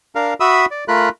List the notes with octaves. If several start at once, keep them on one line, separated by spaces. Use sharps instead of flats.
D4 A#4 F5
F#4 E5 B5 D#6 E6
D5
A3 F4 A#4 B5 F#6